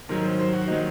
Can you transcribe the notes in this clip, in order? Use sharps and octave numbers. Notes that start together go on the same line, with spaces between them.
G#2 D#3 F#3 A#4
C5
C5
F#4
D#3 F#3 D#4